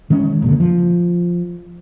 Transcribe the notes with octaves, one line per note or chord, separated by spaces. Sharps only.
D#3 G#3 C#4
F#1 A#2 D3
F3